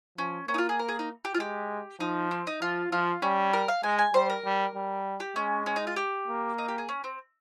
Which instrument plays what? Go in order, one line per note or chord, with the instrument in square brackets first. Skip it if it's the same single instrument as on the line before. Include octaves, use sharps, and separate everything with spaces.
[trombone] F3 [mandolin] C#4
[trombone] A#3 [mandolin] C#4
[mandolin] D#4
F4
G#4
A#4
G#4
D#4
G4
F4
[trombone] G#3 [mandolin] G4
[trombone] F3 [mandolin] D#4
[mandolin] C4
D#4
[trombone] F3 [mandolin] F4
[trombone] F3 [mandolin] F4
[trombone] G3 [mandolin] C#4
[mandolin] A#4
F5
[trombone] G#3 [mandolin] G#5
[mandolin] G#5
[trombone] G3 [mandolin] C5
[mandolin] A#4
[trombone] G3
G3
[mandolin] G4
[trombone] G#3 [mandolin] C#4
[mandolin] C#4
D#4
F4
G4
[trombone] A#3
[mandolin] D#4
G4
G#4
C#4
C4